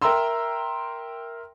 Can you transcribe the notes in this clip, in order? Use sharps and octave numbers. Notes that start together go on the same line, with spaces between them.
A#4 E5 G5 A#5 C6 E6